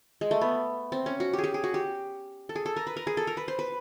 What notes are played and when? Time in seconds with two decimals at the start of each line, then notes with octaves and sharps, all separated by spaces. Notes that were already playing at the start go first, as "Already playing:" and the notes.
0.21 G#3
0.31 A3
0.41 B3
0.92 C4
1.06 C#4
1.20 F#4
1.33 G4
1.38 G#4
1.44 G4
1.54 G#4
1.64 F#4
1.74 G4
2.49 A4
2.56 G#4
2.66 A4
2.76 A#4
2.87 B4
2.96 A#4
3.07 G#4
3.17 A4
3.27 A#4
3.37 B4
3.48 C5
3.59 B4